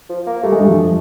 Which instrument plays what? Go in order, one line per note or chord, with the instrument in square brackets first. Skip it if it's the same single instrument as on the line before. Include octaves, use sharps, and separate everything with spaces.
[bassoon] F3
A#3
[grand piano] G3 [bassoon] A3
[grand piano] G#3
G2 G3
F2 F3